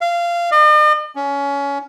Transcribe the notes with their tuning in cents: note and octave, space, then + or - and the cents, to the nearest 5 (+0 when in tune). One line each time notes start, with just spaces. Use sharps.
F5 -20
D#5 -45
C#4 +20